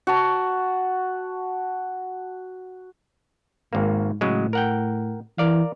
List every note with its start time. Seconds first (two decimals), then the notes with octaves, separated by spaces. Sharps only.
0.07 F#4 A5
3.73 G#1 G#2 A#3
4.21 A2 C#3 F#3 G#3
4.53 A#4 F#5 G5
5.38 E3 A#4 D5 F5